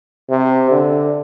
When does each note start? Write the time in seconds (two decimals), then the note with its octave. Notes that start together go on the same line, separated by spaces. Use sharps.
0.30 C3
0.71 D3